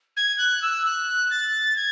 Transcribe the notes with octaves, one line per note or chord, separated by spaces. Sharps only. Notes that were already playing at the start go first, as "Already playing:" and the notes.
G#6
F#6
E6
F#6
A6
G#6